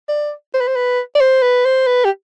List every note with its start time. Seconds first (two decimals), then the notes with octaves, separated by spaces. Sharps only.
0.09 D5
0.54 C5
0.61 B4
0.68 C5
0.76 B4
1.15 D5
1.21 C5
1.42 B4
1.65 C5
1.87 B4
2.05 G4